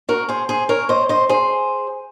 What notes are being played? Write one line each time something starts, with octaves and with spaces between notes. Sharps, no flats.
F#4 A#4
G#4 C5
G#4 C5
A#4 C#5
C5 D#5
C5 D#5
G#4 C5